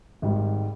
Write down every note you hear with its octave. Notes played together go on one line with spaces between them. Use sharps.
G#1 G#2 G3